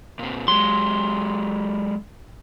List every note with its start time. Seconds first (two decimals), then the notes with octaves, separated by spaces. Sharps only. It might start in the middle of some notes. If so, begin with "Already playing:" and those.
0.19 A#2 C4
0.48 F#3 G#3 C6